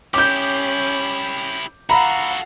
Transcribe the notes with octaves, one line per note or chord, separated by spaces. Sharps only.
C#4 E4 G4 D6 G6
F#4 A4 F5 F#5 A#5 B5